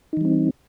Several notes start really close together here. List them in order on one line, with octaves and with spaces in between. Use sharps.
D#4 E3 G3 C4